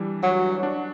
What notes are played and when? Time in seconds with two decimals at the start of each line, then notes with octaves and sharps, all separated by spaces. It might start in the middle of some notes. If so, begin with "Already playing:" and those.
Already playing: E3 G3 D4
0.23 F#3 F#4
0.63 D4